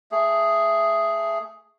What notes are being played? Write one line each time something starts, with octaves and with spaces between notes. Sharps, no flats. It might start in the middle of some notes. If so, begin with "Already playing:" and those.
A3 G#4